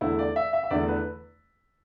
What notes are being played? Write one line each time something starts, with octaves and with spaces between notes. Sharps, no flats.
E2 D3 A3 E4
D5
E5
E5
E5
E2 D3 A3 D5
B4